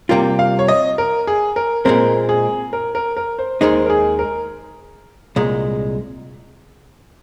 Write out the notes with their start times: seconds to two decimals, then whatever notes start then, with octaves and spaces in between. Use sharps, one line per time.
0.09 C3 G3 A#3 F4 G5
0.39 F5
0.59 C#5
0.68 D#5
0.98 A#4
1.27 G#4
1.56 A#4
1.85 A#2 G#3 C4 A#4
2.29 G#4
2.73 A#4
2.95 A#4
3.17 A#4
3.39 C5
3.61 D#2 D#3 G#3 D#4 C5
3.86 A#4
3.90 G#4
4.19 A#4
5.36 C2 A#2 G#3